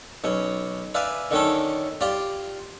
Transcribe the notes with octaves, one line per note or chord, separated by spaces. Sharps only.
B1 C#4
B4 D5 E5 F5 G#5
D3 D#3 C#4 A4
F4 G4 D5